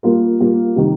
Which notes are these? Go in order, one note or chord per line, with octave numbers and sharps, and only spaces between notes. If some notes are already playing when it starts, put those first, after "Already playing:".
G3 A#3 F4 A#4
G3 A#3 F4 A#4
C3 D#3 G3